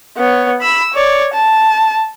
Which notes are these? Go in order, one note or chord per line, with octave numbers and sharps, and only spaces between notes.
B3 C#5
B5 E6
C#5 D5
A5